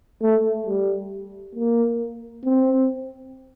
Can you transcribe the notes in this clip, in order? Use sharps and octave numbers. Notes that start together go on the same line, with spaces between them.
A3
G3
A#3
C4